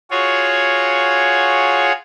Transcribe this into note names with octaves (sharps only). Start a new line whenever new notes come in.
F4 F#4 G#4 C#5